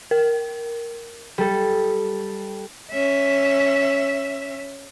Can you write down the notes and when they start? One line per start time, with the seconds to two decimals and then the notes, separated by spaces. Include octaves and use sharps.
0.11 A#4
1.38 G3 A4
2.92 C#4 E5